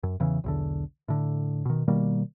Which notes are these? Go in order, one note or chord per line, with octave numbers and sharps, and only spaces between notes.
F#2
E2 C#3 E3
B1 E2 D3
A2 D3
B2 D#3
B2 D#3 G3 A#3